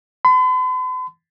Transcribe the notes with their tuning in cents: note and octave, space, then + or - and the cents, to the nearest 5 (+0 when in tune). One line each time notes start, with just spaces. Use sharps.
B5 +45